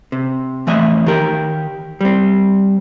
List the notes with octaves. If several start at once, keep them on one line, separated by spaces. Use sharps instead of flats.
C3
F2 E3 A3 D#5 E5
D#3 G4 A#4
G3 C4